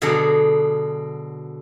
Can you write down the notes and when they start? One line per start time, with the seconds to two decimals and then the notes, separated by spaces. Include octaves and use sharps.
0.02 B2 D3 F#3 G#4 A4 A#5